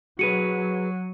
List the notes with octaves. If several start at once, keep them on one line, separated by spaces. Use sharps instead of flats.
F#3 F#4 G#4 B4 C#7 D#7